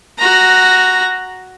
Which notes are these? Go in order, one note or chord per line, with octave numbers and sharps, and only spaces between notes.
F#4 A#5